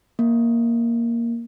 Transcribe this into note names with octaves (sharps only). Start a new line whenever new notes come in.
A#3